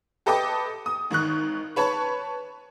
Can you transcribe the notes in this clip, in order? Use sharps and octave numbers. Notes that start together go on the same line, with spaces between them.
G4 A4 B4 D#5 G5 D6
D#6
G#1 D#3 C#6 F#6
B4 C#5 A5 B5 C#6